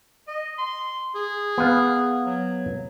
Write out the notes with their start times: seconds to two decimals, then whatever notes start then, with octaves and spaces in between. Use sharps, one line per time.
0.28 D#5
0.58 C6
1.15 G#4
1.58 B3 F5
2.26 F#3